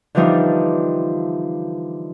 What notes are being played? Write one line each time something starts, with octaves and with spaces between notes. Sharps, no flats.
D3 E3 F3 G3 D4 D#4